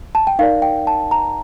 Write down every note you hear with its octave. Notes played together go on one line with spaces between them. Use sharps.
A5
G5
D#4 A#4 D5 F5
G5
A5
A#5